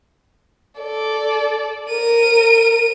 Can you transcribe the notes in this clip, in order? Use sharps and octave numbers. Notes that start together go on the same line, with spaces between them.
A4 D5
A#4 D#7